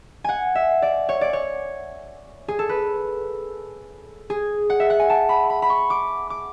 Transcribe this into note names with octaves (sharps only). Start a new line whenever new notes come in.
F#5 G#5
E5
D5
C#5
D5
C#5
G#4
A4
B4
G#4
F#5
E5
F#5
G#5
A5
B5
B5
B5
C#6
D6
D6